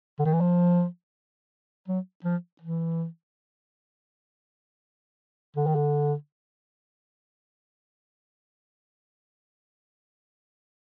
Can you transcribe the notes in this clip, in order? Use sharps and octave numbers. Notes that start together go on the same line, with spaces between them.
D3
D#3
E3
F3
F#3
F3
E3
D3
D#3
D3